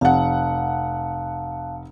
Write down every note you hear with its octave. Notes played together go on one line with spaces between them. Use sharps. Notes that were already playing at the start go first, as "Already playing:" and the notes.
F1 F5 F#5 A5